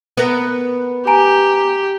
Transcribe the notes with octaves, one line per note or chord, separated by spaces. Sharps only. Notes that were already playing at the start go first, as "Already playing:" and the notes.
B3 A#4
G4 G#5 A#5 D7